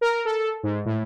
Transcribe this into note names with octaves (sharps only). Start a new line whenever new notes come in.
A#4
A4
G#2
A2